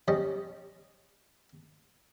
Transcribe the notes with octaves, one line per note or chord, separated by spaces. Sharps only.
G3 C#4 D#5